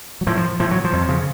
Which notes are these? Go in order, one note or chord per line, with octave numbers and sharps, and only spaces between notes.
F#3
A2 F3
F3
A2 F3
F#3
F3
F2
C#3